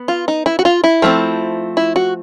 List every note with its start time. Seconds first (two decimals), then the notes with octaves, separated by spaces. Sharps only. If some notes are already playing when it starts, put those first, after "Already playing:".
Already playing: B3
0.08 F4
0.28 D#4
0.46 E4
0.59 F#4
0.65 F4
0.84 E4
1.02 F3 A3 C4
1.77 E4
1.96 F#4